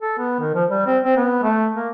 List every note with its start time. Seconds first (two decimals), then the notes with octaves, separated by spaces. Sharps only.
0.01 A4
0.18 B3
0.40 D#3
0.54 F3
0.69 G3
0.86 C4
1.03 C4
1.17 B3
1.43 A3
1.75 A#3